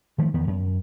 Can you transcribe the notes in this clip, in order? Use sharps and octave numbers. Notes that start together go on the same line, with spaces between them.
D#3 F3 G#3 A3
E2 D#3 B3
F#2